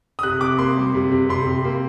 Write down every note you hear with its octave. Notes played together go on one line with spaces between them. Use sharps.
D#6
C3 F#6
C3 D6
A#3 C6
G3
C3
C3
C3 C6
C3
A#3